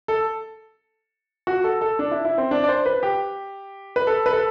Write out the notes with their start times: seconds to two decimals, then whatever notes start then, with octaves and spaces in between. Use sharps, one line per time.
0.08 A4
1.47 F#4
1.64 A4
1.81 A4
1.99 D4
2.11 E4
2.25 E4
2.38 C4
2.51 D4
2.64 D5
2.69 C5
2.86 B4
3.03 G4
3.96 B4
4.07 A4
4.26 B4
4.33 A4